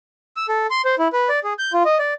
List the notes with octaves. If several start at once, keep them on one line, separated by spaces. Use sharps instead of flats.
E6
A4
C6
C5
E4
B4
D5
G#4
G6
F4
D#5
D5